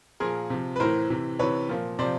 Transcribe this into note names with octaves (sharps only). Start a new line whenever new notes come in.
A#2 F3 G#4 A#4
C3 F3
B4
A2 E3 A#4 C5
C3 E3
C3 E3 B4 C#5
A#2 F3
C3 F3 C5 D5